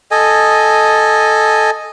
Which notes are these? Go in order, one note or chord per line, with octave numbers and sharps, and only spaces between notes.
A4 D#5 G#5